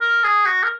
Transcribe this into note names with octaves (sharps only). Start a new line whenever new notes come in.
A#4
G#4
F#4
A#4